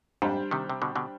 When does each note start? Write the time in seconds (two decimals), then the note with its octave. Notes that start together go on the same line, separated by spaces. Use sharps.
0.22 F2 G#2 G3 D4 G4 C5
0.51 C3 D#3
0.70 C3
0.82 B2 D3
0.96 B2 D3